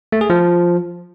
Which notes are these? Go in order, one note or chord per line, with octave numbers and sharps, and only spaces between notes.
A3
G#4
F3